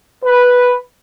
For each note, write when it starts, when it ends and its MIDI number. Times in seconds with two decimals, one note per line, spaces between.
0.25 0.72 71